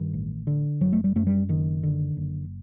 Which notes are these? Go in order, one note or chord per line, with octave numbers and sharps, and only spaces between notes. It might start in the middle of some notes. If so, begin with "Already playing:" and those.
Already playing: G2 D#3
A1
D3
F#1 F#3
A3
G3
F#2 A3
G3
F#1 D#3
D3
F#1